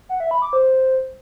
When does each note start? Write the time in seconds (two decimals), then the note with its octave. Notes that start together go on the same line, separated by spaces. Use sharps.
0.09 F#5
0.20 E5
0.31 B5
0.42 D6
0.53 C5